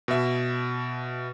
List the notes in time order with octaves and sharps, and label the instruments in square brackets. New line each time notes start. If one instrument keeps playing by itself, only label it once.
[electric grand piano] B2 E5